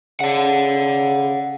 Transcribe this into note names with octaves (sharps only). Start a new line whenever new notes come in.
C#3 D5 F#5